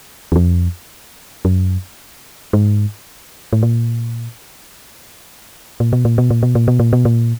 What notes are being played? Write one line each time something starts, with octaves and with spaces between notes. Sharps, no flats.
E2
F2
F#2
G#2
A2
A#2
A#2
B2
A#2
B2
A#2
B2
A#2
B2
A#2
B2
A#2